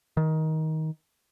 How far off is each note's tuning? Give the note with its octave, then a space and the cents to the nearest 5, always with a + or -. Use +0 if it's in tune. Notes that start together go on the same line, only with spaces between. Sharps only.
D#3 +20